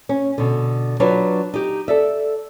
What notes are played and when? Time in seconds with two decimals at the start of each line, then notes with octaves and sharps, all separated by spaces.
0.09 C#4
0.38 B2 D3
1.00 F#3 D4 F4 B4 C#5
1.54 D#4 G4
1.88 A4 D5 E5